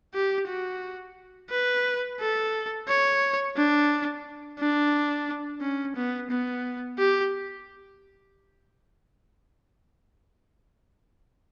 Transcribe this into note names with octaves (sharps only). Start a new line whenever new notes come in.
G4
F#4
B4
A4
C#5
D4
D4
C#4
B3
B3
G4